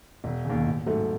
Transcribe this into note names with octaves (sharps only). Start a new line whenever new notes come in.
E1
D#2 C#3
A1
G#2 F#3 A3